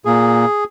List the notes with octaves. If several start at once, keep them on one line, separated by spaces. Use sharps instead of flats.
A#2 A#3 G#4